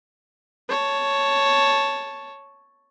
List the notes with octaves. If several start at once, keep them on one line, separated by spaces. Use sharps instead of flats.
C#5 A5